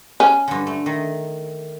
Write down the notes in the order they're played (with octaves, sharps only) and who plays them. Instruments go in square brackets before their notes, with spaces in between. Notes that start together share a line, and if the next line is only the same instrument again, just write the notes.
[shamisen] C#4
[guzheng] G2 D3
A3
D#3